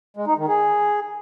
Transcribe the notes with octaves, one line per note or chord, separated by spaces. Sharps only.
G#3
D#4
D#3
G#4